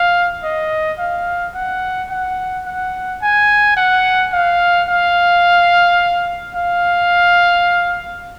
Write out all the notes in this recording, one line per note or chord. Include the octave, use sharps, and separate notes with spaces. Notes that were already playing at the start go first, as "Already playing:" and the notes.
Already playing: F5
D#5
F5
F#5
F#5
F#5
G#5
F#5
F5
F5
F5